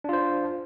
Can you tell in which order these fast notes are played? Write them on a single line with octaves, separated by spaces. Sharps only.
D4 F4 C5